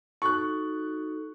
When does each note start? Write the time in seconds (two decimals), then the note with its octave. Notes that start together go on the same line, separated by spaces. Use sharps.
0.22 D#4 F#4 A4 C#6 F#6